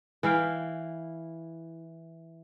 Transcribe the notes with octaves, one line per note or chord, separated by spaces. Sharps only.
E3 E4 F5 G5